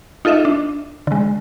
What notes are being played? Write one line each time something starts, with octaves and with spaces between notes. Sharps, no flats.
D#4 F4 A4 D#5 E5
D4
D3 G#3